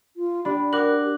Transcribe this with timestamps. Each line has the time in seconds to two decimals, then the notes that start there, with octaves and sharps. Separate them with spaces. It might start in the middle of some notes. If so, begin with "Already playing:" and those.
0.16 F4
0.45 D4 G4 B5
0.73 F#4 A#4 D6 F#6 F#7